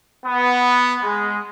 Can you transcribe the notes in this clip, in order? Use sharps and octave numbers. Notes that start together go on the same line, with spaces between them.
B3
G#3